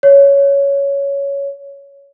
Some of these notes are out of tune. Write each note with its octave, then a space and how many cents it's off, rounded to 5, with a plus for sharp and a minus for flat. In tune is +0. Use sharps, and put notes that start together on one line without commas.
C#5 +10